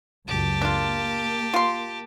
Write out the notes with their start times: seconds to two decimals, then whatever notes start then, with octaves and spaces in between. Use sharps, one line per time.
0.28 C#2 F#2 F#3 G4 A5
0.62 A#3 D4 F4
1.54 F4 C6